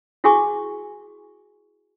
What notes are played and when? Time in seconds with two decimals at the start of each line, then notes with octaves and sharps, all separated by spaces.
0.24 E4 F#4 G#4 G#5 C#6 D6